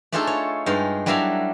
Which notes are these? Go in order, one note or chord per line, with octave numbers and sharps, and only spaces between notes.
A3 D4 D#4 F4 G#4 A4
C#5
G2 G#3 D#4 F5
F#3 G3 D4 E4 A#4 F5